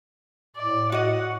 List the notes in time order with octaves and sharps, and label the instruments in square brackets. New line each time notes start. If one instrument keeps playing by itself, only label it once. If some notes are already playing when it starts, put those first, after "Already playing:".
[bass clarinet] A2 [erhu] D5
[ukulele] F#4 D#5 [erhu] F#5